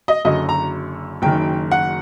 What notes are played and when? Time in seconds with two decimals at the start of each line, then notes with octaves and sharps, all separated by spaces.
0.08 D#5
0.25 F#1 F#2 D3 D#5
0.49 A#5
1.22 F#1 F#2 D#3 G5
1.71 F#5